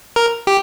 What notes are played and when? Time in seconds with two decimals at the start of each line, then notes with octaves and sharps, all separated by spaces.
0.16 A#4
0.47 G4